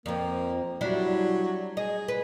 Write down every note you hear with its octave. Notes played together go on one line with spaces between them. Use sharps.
F2 F3 A#3
F#3 G3 D4 E4
G#4 D#5
B4